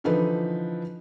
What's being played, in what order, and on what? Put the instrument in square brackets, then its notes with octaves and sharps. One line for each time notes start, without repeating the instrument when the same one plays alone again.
[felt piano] D3 E3 F3 D#4 A4 B4